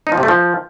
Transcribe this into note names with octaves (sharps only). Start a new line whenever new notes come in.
D#4
F3
C3
A3
F3